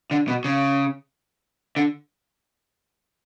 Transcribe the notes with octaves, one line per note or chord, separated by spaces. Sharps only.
D3
B2
C#3
D3